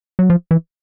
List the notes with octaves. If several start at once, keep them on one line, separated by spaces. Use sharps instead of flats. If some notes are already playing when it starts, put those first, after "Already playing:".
F#3
F3
E3